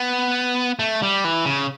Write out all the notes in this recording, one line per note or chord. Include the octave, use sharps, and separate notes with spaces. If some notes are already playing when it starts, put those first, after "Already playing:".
Already playing: B3
A3
G3
E3
C#3